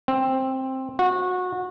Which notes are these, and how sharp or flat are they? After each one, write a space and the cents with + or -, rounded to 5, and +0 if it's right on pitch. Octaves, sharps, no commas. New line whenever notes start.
C4 +10
F#4 -25